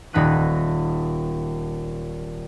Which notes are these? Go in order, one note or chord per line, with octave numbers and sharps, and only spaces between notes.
D#1 D#4 B5 F#6 D#7